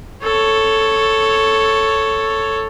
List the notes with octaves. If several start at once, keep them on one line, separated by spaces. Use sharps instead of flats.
A4 C#5